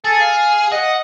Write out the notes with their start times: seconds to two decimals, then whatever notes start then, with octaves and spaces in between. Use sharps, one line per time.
0.05 G#4 A4
0.21 F5
0.72 D#5 F#5